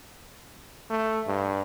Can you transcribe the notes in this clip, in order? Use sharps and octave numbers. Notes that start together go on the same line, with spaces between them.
A3
G2